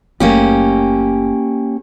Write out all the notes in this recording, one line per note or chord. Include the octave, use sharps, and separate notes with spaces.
F#1 A3 A#3 C#4 G4